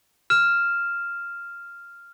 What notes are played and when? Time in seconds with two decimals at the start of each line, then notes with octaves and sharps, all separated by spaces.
0.30 F6 E7